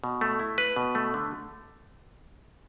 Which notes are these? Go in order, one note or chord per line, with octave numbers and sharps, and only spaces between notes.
B2
A3
E4
B4
B2
A3
D3